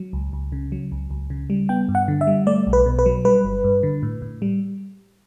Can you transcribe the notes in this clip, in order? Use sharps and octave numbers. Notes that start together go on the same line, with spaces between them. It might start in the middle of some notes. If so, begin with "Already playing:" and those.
Already playing: F#3
C#2
C#2
C#3
F#3
C#2
C#2
C#3
G3
B3 G5
G2
F#5
D3
E5
G3
A3 D5
B1
B4
B2
B4
F#3
G3 B4
G1
G2
D3
A2
A2
G3